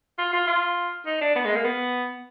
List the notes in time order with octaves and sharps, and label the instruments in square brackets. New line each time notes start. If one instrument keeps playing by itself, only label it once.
[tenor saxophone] F4
F4
F4
D#4
D4
B3
G#3
A#3
B3